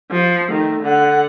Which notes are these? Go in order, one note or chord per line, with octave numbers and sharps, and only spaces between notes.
F3
D#3 A3
D3 F#5